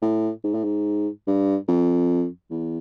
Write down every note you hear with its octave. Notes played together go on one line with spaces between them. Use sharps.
A2
G#2
A2
G#2
G2
F2
E2